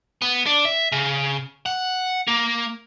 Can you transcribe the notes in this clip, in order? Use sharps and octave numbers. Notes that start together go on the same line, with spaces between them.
B3
D4
E5
C#3
F#5
A#3